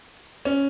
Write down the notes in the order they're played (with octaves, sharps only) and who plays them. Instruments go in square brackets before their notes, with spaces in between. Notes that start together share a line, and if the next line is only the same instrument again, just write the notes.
[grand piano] C#4